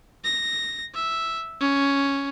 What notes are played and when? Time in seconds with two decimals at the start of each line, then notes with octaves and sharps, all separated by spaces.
0.24 A#6
0.95 E5
1.61 C#4